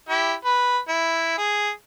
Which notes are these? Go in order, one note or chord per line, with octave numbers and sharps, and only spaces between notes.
E4 G4
B4
E4
G#4